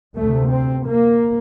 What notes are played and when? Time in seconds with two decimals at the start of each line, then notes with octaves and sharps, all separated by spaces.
0.17 D2 C3 A3
0.51 C4
0.87 A#3